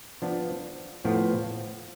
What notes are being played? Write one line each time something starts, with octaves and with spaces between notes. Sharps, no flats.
F3 B3 D4
A2 F3 B3 F4